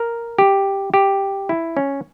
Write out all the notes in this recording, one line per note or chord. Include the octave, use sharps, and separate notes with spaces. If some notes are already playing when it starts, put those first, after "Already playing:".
Already playing: A#4
G4
G4
E4
C#4